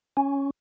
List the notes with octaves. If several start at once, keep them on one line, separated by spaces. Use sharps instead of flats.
C#4